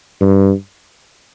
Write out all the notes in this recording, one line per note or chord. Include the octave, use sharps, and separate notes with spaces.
G2